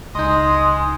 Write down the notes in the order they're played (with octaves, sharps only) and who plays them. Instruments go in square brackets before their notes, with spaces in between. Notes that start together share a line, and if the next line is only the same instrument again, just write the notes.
[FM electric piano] C#2 D#4 [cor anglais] G#3 [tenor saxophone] D#5 [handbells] C6 G6